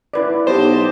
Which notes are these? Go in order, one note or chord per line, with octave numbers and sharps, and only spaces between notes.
E4 B4 D5
B1 G4 C5 D#5 A5